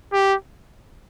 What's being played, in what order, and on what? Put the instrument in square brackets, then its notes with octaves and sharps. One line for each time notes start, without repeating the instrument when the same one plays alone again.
[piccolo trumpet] G4